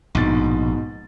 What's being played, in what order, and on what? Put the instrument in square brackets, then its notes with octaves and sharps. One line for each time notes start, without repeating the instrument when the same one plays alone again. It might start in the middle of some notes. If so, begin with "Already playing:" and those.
[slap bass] A#1 [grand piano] G#2 B2 A6